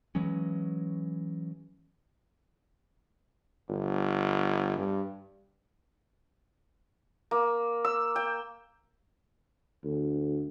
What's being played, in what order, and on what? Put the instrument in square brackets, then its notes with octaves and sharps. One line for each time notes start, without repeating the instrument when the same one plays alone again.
[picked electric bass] E3 F#3 G#3 C#4
[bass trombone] G1
G2
[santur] A#3
E6
G5
[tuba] D2